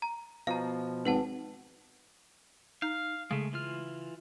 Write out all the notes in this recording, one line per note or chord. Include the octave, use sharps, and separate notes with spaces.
A#5
B2 F3 F5 A#5
G#1 B4 F#5 A5
D#4 F5
C#3 G#3 A3
E3 F4 F6